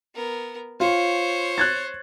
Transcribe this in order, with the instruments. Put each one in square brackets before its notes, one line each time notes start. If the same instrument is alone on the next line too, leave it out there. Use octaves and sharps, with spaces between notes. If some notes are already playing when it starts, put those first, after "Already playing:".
[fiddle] B3 A#4
[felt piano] F4 [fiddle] C5 C#5
[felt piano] F#6 G#6 A6